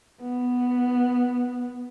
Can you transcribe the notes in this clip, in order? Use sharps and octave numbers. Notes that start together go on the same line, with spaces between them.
B3